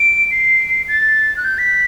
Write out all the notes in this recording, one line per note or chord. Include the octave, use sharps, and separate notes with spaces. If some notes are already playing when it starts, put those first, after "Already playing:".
Already playing: D7
C7
A6
F#6
G6
B6